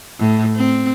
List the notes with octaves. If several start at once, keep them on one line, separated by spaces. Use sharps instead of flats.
A2
C4